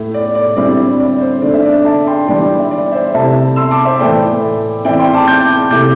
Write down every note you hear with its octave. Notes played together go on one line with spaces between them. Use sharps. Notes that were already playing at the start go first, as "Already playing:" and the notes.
Already playing: A2 A3 E4
D5
D5
D3 G3 C4 E4 D5
D5
C5
D3 A3 D4 D5
E5
D5
E5 A5
G5 C6
E3 G3 D4 D5 G5
E5
D5
C5 E5
C3 A3 E4 E5 A5
C6 E6
A5 D6
C5 E5
A2 E3 A3 D5 G5
E3 C4 E4 D5 G5
G5 C6
A5 D6
D6 G6
C3 A3 E4 D6 G6